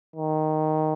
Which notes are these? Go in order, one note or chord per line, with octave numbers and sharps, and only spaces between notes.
D#3